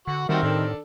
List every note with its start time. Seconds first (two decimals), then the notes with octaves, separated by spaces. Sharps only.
0.07 D3 F#4 F#5 C#6
0.29 D#3 G3 A#3 C4 F#4 G4 A#4 E5
0.43 A2 D4 A4